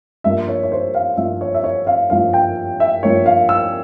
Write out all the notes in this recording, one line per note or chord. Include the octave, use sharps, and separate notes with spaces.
G2 F3 A#3 E5
C#5
C#5
C5
F5
G2 F3 A#3 E5
C#5
E5
C#5
F5
G2 F3 A#3 F5
G5
E5
G2 F3 A#3 C#5
F5
E6